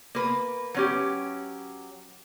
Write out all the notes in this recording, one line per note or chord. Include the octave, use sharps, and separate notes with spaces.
A#3 B4
F#3 C#4 G4